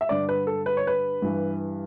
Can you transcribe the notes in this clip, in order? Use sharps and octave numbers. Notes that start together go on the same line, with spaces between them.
E5
G2 D3 D5
B4
A4
B4
C#5
B4
G2 E3